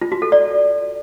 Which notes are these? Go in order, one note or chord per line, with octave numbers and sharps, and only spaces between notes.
F4
F#4
A4
D5